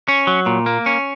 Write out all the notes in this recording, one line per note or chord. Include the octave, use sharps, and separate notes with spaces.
C#4
F#3
A#2
A#3
C#4